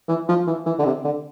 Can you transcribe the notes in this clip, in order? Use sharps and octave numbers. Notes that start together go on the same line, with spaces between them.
E3
F3
E3
E3
D3
C3
D3